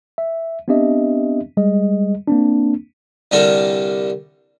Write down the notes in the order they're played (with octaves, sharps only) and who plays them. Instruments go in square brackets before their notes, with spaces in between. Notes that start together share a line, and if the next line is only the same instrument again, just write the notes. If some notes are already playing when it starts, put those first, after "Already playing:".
[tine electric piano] E5
B3 C4 D4 G4 D#5 E5
G3 G#3 G#4 D#5
A#3 C4 D4
[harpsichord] C2 D3 G3 D4 A4 A#4